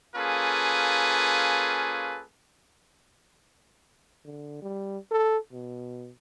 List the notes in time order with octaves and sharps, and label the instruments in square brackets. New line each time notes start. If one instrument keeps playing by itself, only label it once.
[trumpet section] A#3 C#4 F4 G#4 A4 B4
[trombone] D3
G3
A4
B2